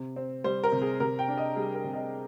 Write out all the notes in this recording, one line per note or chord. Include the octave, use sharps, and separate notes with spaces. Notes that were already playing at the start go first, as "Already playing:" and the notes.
Already playing: C3
C4
G3 C5
A#4
C3
G#4
C3 A#4
G5
D4
D#5
G3 G#4
A#4
C3
D#5